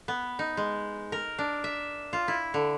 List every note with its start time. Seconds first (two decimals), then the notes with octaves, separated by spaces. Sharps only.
0.08 B3
0.39 D#4
0.57 G#3
1.12 A#4
1.39 D4
1.64 E5
2.13 F4
2.28 E4
2.54 D3